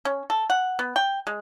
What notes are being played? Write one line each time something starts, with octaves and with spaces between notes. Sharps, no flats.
C#4
A4
F#5
B3
G5
G#3